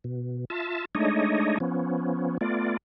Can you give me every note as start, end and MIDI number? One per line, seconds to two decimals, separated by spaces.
0.04 0.45 47
0.50 0.85 65
0.50 0.85 76
0.50 0.85 81
0.95 1.58 56
0.95 1.58 57
0.95 1.58 62
0.95 1.58 63
0.95 1.58 73
0.95 1.58 75
1.60 2.38 53
1.60 2.38 59
1.60 2.38 61
2.41 2.77 57
2.41 2.77 59
2.41 2.77 65
2.41 2.77 74